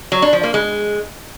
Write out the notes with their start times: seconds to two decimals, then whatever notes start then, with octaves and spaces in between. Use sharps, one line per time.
0.12 F#3
0.22 D4
0.33 F3
0.43 A#3
0.54 G#3